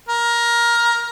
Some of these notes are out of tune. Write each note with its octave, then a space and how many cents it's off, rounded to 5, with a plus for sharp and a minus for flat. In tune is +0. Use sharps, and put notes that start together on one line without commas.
A#4 +15